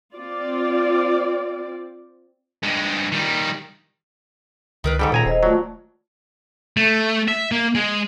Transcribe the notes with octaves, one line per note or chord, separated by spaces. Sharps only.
C4 F4 D5
G2 G#3
D#3 G3
C#2 D#3 A#4 B4
G#2 D#3 G3 A4 G5
C#2 A#2 G#5 A#5
D#1 C5 D#5
F#3 A3 F4 D5
A3
E5
A#3
G#3